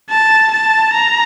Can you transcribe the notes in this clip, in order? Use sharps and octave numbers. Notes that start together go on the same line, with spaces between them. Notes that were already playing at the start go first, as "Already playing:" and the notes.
A5
A5
A#5